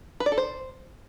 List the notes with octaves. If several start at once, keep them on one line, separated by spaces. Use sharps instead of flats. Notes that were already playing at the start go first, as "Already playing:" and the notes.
B4
D5
A4
C5